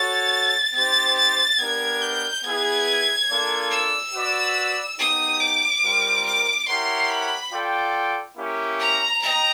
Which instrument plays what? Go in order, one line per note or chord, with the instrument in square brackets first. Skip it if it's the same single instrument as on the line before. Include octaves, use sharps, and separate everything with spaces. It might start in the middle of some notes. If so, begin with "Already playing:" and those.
Already playing: [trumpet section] F#4 A4 C#5 [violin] A6
[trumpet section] C4 D#4 G4 C5 [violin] A6
[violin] A6
[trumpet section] B3 D4 G4 A#4 [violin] G#6
[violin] G6
[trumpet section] B3 E4 G#4 B4 [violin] G#6
[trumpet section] A#3 D4 F4 A4 D5
[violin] E6
[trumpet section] F#4 B4 D5
[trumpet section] B3 D#4 G4 [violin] D#6
[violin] D6
[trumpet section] G3 C4 F4 A#4
[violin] D6
[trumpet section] E4 G4 A#4 C#5 F#5 [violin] C6
[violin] B5
[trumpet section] F4 A4 D5 G5
A#3 C#4 E4 G4
[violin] A#5
[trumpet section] D#5 G5 [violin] A#5